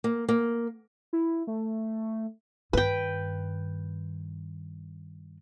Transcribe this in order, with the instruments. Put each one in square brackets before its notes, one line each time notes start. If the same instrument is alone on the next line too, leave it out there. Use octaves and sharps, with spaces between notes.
[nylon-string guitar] A#3
A#3
[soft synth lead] E4
A3
[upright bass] G2 D#3 [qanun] B4 G5